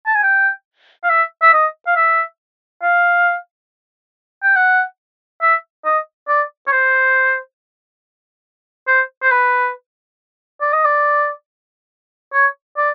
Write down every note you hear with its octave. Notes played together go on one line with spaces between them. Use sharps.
A5
G#5
G5
F5
E5
E5
D#5
F5
E5
F5
G5
F#5
E5
D#5
D5
C#5
C5
C5
C5
B4
D5
D#5
D5
C#5
D5